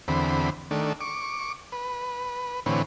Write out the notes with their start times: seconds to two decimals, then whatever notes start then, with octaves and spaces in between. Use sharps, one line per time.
0.08 E2 D3 C4 B5
0.71 D#3 A3 D4
1.01 C#6 D6
1.72 B4
2.66 A2 D3 E3 C4 B4 C#5